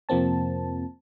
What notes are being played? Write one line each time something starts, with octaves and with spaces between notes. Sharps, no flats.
F2 C3 F3 A#3 C4 A5